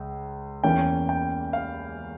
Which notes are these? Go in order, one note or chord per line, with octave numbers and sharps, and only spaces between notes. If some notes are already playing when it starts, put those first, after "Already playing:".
Already playing: C#2
E2 E3 A#3 C#4 G5
G5
F5